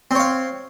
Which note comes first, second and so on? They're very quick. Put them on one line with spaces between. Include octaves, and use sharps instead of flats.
C4 C#5 F5